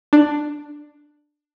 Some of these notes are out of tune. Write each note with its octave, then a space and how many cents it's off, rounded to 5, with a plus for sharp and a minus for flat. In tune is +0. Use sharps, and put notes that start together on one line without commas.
D4 +10